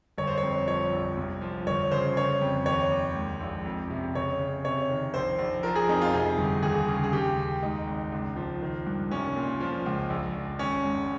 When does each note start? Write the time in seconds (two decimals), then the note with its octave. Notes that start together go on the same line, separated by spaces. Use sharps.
0.18 G1 C#5
0.27 C5
0.38 C#5
0.43 F2
0.68 F3 C#5
0.93 A#1
1.17 C2
1.41 F3
1.66 G1 C#5
1.91 C#3 C5
2.16 C#3 C#5
2.41 F2
2.66 D#2 C#5
2.90 D#2
3.16 G#2
3.41 A#1
3.65 F2
3.90 C3
4.15 C#3 C#5
4.39 C#3
4.65 C3 C#5
4.89 D#3
5.14 A#1 C5
5.39 A#1
5.63 F3 A#4
5.76 G#4
5.89 F2 D#4
6.02 F4
6.13 C3 G#4
6.38 G1
6.63 D#2 G#4
6.88 C#3
7.04 G#4
7.13 D#2 G4
7.37 D#2
7.63 G#2 D#4
7.87 G#1
8.12 C#2
8.36 F3
8.62 D#3
8.87 G2
9.11 C2 C#4
9.36 A#2
9.60 F3
9.86 C#2
10.10 A#1
10.35 A#1
10.59 G#1 C#4
10.84 G#2